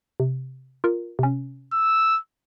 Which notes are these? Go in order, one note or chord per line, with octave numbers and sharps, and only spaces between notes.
C3
F4 A#4
C3 C#4
E6